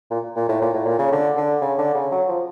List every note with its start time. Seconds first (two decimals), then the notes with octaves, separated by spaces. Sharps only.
0.11 A#2
0.36 A#2
0.49 A2
0.61 A#2
0.74 A2
0.86 A#2
0.98 C#3
1.12 D3
1.37 D3
1.61 C#3
1.78 D3
1.94 C#3
2.12 F#3
2.28 F3